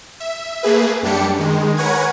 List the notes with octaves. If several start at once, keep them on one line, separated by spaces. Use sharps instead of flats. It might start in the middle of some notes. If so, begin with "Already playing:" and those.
E5
A3 A#3 G#4 B4
F#2 G3 D4 G4 C#7
D#3 G#3
A#4 B4 C#5 F#5 G#5 G#6